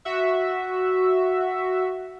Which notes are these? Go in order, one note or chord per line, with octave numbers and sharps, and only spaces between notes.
F#4 E5